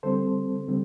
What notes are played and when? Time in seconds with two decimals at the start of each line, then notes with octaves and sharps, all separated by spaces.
0.03 D3 G3 C4 A4 C5
0.68 D3 G3 C4